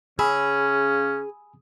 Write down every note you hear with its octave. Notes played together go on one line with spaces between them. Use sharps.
C#3 C#4 G#4 G#5 B5 E6